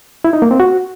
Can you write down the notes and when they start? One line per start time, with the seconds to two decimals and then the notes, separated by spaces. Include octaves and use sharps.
0.24 E4
0.33 D#4
0.42 A#3
0.51 C4
0.60 F#4